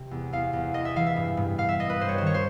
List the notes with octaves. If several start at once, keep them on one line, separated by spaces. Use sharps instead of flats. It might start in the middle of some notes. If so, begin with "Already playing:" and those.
Already playing: C3
E2
E2 F5
E2
E2 D#5
E5
E3 F5
E5
G2
G2
G2 F5
E5
G2 D#5
B4
G2 C5
C#5
D#3 C5
C#5
C5